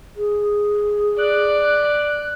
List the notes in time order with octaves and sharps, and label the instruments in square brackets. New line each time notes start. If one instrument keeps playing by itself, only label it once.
[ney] G#4
[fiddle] D5 [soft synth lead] F#6